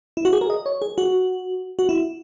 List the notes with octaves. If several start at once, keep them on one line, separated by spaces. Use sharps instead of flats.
E4
F#4
G#4
A#4
D#5
C#5
G#4
F#4
F#4
E4